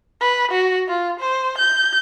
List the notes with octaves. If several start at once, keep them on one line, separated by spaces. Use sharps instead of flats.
B4
F#4
F4
C5
G6